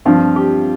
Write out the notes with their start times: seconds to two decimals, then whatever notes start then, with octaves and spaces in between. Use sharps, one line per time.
0.05 G2 F3 C4 F4
0.36 G4